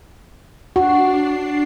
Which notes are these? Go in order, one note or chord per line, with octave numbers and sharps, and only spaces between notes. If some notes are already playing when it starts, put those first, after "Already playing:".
D4 F#4 C7